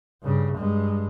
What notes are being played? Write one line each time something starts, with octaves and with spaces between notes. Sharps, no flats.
G2 C#3
G2 G#3